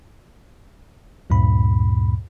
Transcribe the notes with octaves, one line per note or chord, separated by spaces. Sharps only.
D2 G2 A#2 B5